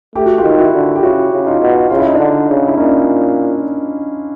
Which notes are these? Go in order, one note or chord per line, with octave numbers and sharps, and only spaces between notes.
A3 G4
F#4
F4 G4
D#3
E4 F#4
D3
G4
C#3 E4 F#4
C#3
D#4 F4
B2
C#3 F4
E4
D#4
D3 D4 E4
C#3
E4
A#2 C#4 D#4